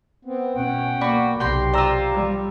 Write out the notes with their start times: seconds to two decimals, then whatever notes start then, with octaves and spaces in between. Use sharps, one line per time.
0.25 B3 C4
0.55 B2 C#4 F#5 G5
1.01 A#3 F#4 D5 B5
1.40 B1 C3 G4 G5 A#5 C6
1.73 F4 C5 D5 A#5 E6
2.12 G3